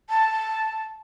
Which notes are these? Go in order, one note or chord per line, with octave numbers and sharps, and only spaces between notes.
A5